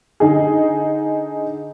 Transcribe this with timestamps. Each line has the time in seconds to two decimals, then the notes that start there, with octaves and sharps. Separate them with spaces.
0.20 D3 D#4 G#4